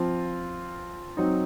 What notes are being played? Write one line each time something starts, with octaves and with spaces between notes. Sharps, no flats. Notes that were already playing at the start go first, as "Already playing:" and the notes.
Already playing: F3 C4 F4
F#3 C4 D#4